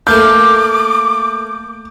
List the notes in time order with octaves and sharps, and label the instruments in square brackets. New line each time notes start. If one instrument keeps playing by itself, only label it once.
[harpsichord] A3 A#3 F5 [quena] D6 [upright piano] G6